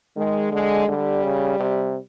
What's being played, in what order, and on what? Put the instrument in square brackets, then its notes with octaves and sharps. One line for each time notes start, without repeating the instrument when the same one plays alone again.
[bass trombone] D#3 [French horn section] G#3
[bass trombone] D3 [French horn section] G#3
[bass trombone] D3 [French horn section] G3
[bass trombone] C#3
C3